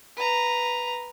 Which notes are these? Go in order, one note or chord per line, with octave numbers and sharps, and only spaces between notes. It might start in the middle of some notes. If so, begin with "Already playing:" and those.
B4 A#5